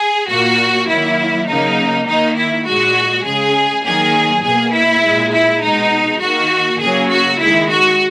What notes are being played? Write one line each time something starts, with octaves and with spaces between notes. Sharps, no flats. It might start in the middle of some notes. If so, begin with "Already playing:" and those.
Already playing: G#4
A#2 A#3 F#4
D#3 F#3 A#3 E4
C#3 F#3 A#3 D#4
D#3 A#3 D#4
E4
A#2 G#3 F#4
C#3 G#3 G#4
D#3 F#3 A#3 G#4
B2 A#3 G#4
E4
A#2 G#3
E4
B2 G#3 D#4
D#3 A#3 F#4
C#3 F#3 A#3 G#4
F#4
D#3 G#3 E4
F#4